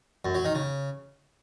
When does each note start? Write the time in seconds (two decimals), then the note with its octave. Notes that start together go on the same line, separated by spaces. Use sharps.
0.25 F#2
0.35 F#3
0.45 D#3
0.55 C#3